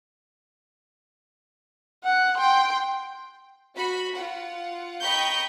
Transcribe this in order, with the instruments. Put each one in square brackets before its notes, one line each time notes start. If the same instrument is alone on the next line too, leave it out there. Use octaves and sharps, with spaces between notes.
[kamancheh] F#5 F#6
G5 C6
[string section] F#4 B5
F4 F#5
D#5 G5 A#5 B5 C#6 G6